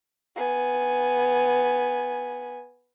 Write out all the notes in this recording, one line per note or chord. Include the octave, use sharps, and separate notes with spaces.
B3 G#5